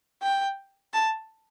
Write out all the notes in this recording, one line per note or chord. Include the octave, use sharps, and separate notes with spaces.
G5
A5